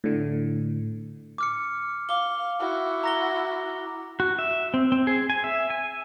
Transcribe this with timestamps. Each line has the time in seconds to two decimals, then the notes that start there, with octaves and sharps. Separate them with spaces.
0.04 A2 D3
1.38 D6 F6 C#7
2.09 F5 D6 G7
2.60 E4 F#4
3.04 A#5 A#6 G7
4.20 F#4
4.39 E5
4.74 C4
4.92 C4
5.07 G#4
5.30 G#5
5.44 E5
5.70 G#5